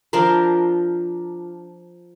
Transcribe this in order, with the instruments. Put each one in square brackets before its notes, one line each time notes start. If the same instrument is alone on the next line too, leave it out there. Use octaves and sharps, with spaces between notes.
[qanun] F3 D4 F4 A#4